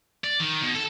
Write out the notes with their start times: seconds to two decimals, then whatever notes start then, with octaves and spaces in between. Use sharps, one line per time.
0.24 D5
0.40 D#3
0.62 B2
0.75 A4